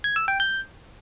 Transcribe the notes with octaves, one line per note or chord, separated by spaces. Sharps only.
G#6
E6
G5
G6